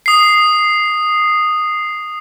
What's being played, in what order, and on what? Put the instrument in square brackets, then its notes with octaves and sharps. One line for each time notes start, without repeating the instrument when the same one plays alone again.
[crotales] D#6 C7